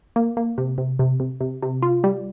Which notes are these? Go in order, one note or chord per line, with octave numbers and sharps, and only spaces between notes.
A#3
A#3
C3
C3
C3
C3
C3
C3
F4
G3